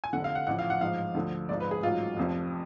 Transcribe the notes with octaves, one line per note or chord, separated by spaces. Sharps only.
G#5
F1 F2 D3 F#5
F5
F#5
A1 A2 F3 F#5
F5
F#5
A1 G#2 F3 F5
D2 D3 F3
G#1 G#2 F3 D5
B4
G#4
A1 G#2 F#3 F4
F1 F2 F3